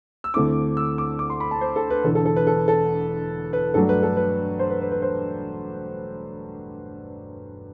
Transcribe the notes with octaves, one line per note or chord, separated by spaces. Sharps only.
E6
D2 D3 A3 C4 E4 D6
E6
D6
D6
C6
B5
A5
C5
A4
B4
E1 E2 D3 A4
A4
A4
B4
A4
A4
B4
G2 F#3 A3 D4 A4
B4
A4
B4
C5
B4
B4
B4
C5